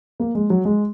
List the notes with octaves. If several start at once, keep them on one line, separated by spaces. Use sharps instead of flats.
A#3
G#3
F#3
G#3